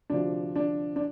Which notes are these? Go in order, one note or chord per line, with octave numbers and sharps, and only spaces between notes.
D2 C3 F3 D4
D4
D4